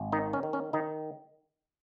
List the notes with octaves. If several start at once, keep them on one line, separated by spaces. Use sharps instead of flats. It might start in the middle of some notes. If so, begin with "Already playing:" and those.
Already playing: G#1
D#3 D#4
C#4
D#3
C#4
D#3 D#4